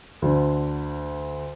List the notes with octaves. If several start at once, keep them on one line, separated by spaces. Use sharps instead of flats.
D2 D3